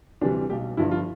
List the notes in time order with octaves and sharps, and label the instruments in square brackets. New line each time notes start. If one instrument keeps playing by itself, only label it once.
[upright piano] D2 C3 E3 G3 D4
B1 B2 G3 G4
G1 G2 F3 E4
F4